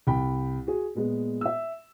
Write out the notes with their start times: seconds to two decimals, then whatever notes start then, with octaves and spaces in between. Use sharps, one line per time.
0.07 C2 G5 B5
0.67 F#4 G#4
0.95 A#2 G#3 B3
1.41 E5 E6